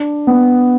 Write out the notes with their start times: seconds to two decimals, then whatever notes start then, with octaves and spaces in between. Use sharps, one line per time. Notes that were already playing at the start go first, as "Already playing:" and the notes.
Already playing: D4
0.27 B3